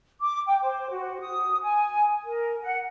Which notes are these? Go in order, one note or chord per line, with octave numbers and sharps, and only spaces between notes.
D6
G5
C5
F#4
D#6
G#5
A#4
F#5